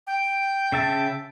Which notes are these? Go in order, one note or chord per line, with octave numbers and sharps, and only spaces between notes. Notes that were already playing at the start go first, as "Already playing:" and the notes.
G5
C#3 E5 A5